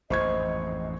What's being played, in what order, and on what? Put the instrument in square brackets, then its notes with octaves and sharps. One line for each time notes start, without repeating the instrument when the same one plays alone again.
[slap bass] A1 F2 G#2 [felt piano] C5 C#6 G#6 [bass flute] D#5